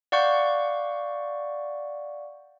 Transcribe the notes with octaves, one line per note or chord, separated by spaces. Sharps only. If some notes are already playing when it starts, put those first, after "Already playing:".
D5 F5 F#5 C#6 G6